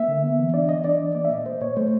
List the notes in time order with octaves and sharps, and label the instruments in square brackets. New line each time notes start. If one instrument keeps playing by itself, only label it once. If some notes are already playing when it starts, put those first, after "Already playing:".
Already playing: [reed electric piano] A#3 E5
D3
B3
E3
D4 D5
E3 D#5
D4 D5
E3
A#3 D5
E5
A#2 D#5
A#3 C5
A#2 C#5
A3 C5